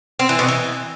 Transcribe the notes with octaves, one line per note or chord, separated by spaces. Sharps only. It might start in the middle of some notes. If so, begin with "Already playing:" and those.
C4
E3
B2
E3